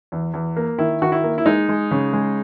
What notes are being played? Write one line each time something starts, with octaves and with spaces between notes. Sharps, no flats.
E2
E2
A#3
D#3 E4
D#3 F#4
E4
A#3
E4
G#3 D#4
G#3
C#3
G#3